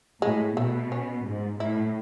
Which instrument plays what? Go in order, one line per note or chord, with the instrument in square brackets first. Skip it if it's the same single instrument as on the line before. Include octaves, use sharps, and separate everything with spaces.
[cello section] A2 [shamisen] G#3
[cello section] B2 [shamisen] A3
[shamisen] C#4
[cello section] G#2
[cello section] A2 [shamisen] E4